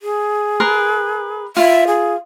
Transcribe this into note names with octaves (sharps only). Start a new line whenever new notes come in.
G#4
A#4 B4 C6
F4 E5
G#4